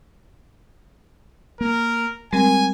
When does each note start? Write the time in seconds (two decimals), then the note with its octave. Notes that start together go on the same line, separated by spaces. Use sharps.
1.61 A#3 A#4
2.33 G3 G#3 C4 A#4 G#5